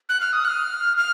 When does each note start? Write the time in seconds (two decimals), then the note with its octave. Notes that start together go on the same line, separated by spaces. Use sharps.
0.09 F#6
0.21 F6
0.33 D#6
0.45 F#6
0.48 F6
0.97 F6